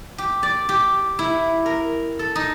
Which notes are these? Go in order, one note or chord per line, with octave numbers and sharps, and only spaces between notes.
G4
D5
G4
E4
A#4
A4
D#4